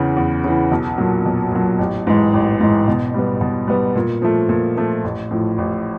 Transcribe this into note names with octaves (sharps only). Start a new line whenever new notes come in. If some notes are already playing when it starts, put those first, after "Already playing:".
Already playing: E2 C#3 E3
E2
C#3 E3
B1
A#2 F#3
B1
A#2 F#3
A1
G#2 E3 G#3
A1
G#2 E3 G#3
B2
G3 B3
B2
G3 B3
A#2
F3 A3
A#2
F3 A3
A1
A2 F3
A1